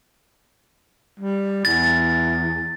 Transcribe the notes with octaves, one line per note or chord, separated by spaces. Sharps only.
G3
E2 A6